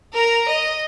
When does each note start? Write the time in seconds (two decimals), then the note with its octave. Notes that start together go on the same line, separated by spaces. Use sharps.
0.14 A#4 A#5
0.49 D#5